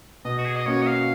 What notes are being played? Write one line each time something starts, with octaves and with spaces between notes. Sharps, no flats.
B2 D#5
F#4
G#4
D#5
A#3 C#4 F#4 C#5
D#5
F5